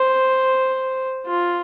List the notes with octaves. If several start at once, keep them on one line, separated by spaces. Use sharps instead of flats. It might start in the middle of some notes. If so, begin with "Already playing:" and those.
Already playing: C5
F4